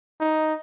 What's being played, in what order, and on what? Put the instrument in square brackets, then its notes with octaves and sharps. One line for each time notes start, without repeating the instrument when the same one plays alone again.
[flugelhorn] D#4